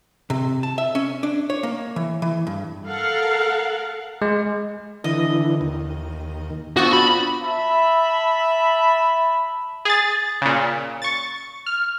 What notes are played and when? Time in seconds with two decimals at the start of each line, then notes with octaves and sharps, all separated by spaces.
0.30 C3
0.63 A5
0.78 E5
0.95 C#4
1.23 D4
1.50 C#5
1.63 A#3
1.96 E3
2.22 E3
2.47 G2
2.88 A4 A#4 F5 F#5
4.22 G#3
5.04 D3 E3 D#5
5.61 D#2
6.77 B3 C4 D4 F4 F#4
6.93 B5
7.40 E5 A5 B5
9.85 G#4 A6
10.41 A#2 C#3
11.02 C#6 A6
11.66 F6